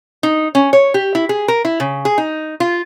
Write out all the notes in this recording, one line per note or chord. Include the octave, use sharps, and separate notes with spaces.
D#4
C#4
C#5
G4
E4
G#4
A#4
E4
C#3
G#4
D#4
F4